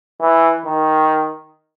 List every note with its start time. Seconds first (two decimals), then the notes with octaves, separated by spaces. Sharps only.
0.21 E3
0.66 D#3